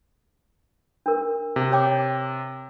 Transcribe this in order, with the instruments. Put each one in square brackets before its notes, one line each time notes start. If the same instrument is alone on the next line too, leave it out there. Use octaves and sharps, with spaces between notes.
[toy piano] D4 A#4
[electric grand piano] C3
[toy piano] C#5 G5 D6